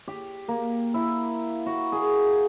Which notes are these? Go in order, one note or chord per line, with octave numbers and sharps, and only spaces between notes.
G4
A#3
E4
F#4
G#4